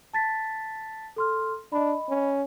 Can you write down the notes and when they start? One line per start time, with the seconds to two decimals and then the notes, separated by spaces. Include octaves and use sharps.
0.13 A5 A6 B6
1.16 A4 C6 F6
1.72 D4 D#5 B5
2.09 C#4